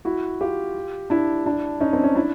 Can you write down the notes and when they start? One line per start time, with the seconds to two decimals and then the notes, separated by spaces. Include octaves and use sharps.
0.05 E4 F#4
0.41 F4 G4
1.10 D4 E4
1.45 D4 E4
1.81 C#4 D#4
1.93 C4 D4
2.04 C#4 D#4
2.15 D4 E4